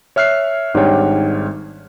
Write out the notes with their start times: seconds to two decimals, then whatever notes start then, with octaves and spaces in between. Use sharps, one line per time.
0.16 C#5 E5 F6 F#6 C7
0.74 G#1 G#2 G3 D4 C#5 G5